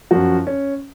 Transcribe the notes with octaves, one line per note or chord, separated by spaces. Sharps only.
F#2 F3 F#4
C#4